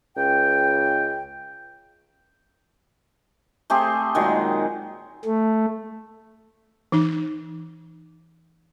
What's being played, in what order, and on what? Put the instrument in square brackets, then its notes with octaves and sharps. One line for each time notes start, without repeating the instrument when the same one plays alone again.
[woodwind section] C#2 G5
[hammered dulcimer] A3 C4 G4 G#4
A#2 D#3 F#3 G#3
[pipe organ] A3
[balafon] E3 D#4